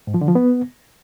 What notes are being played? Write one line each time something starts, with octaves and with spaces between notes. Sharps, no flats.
G#2
F3
D3
F3
B3